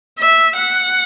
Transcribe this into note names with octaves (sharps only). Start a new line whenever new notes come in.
E5
F#5